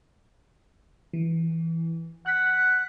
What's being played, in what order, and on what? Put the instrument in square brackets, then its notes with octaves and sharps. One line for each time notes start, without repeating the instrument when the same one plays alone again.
[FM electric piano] E3
[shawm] F#5 [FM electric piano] F#6 B6